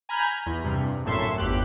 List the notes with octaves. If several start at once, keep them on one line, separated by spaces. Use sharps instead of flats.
G#5 A#5 B5 F6 G6 G#6
G6 B6
E2
G2 C3
A#1 F#2 A2 A4 E5 C6
G1 E2 G4 F#6